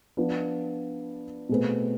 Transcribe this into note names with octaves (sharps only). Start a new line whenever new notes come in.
F3 B3 D4 F4 B4
B2 A3 C4 G#4 B4